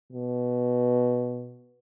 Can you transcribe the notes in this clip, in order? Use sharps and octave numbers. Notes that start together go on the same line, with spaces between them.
B2